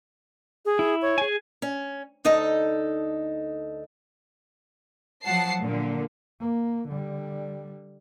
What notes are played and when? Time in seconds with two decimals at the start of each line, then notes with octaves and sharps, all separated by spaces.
0.65 G#4
0.79 E4
1.02 C#5
1.18 G#4 G#5
1.62 C#4
2.25 D2 D#4 A4 D#5
5.24 F3 F#3 F#5 A5 C7
5.61 A#2 D3 A#3
6.41 A#3
6.88 D3 G3